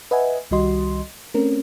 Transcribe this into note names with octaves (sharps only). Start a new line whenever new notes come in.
B4 D#5 E5 F#5 G#5
C2 D#3 G3 F#4 D#5 C6
A3 C4 C#4 A#4